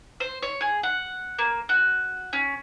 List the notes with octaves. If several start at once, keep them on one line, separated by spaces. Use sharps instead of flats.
C5
C#5
G#4
F#5
A#3
F#4
C#4